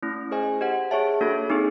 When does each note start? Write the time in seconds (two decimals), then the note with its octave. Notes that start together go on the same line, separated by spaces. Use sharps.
0.02 A3 C#4 E4
0.31 G#4 C5 D#5 G#5
0.61 G4 C5 D#5 F#5
0.91 G#4 C#5 E5 A5
1.21 A#3 D4 F#4 A4 C#5
1.50 C4 D#4 G#4